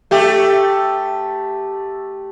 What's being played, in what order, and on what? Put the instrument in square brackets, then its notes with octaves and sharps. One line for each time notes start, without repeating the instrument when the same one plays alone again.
[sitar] A3 G4